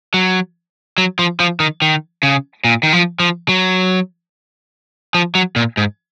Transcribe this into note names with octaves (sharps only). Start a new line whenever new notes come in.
F#3
F#3
F3
F3
D#3
D#3
C#3
A#2
D#3
F3
F3
F#3
F3
F#3
A#2
G#2